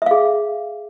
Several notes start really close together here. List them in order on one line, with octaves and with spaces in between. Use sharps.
E5 F5 G#4